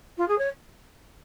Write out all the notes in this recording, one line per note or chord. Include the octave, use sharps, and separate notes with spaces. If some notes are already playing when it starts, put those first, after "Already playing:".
F4
G#4
C#5